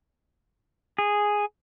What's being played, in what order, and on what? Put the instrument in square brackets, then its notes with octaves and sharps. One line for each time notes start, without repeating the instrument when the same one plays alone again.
[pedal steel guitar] G#4